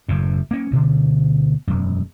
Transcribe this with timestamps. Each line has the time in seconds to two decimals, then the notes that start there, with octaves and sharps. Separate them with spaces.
0.08 F#1 F#2 A2
0.51 A#3 C#4
0.71 D2 B2 D3
1.67 E1 F#2